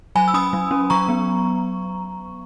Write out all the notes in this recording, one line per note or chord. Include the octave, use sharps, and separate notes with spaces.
F#3 G#5 B5
E6
C#4 B5 D#6
F#3
C#4
F#3 A#5 C#6
B3